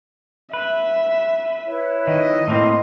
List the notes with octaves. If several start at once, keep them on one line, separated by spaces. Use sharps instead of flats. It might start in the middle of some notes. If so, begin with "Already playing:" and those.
B4 E5
E4 B4 C#5
D#3 D#5
A2 A#3 C4 E4 C6